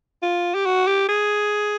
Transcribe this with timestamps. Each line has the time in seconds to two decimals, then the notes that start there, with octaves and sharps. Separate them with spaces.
0.23 F4
0.54 G4
0.66 F#4
0.87 G4
1.09 G#4